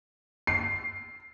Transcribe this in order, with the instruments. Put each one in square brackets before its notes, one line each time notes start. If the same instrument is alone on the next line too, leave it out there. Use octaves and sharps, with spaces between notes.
[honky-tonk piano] C7